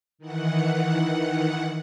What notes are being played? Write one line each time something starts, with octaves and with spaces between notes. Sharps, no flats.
D#3 E3 F#5